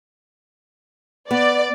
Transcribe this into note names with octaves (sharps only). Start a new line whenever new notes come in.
B3 D5